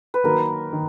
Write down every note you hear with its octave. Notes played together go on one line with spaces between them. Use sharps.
B4
D#3 F#3 A#3 A#4
D#3